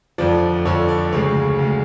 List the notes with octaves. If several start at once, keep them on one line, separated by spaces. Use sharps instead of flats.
F2 D3 F3 D5
F2 D3 F3 C#5
D5
D2 C#3 G#3 C#5
D2 C#3 G#3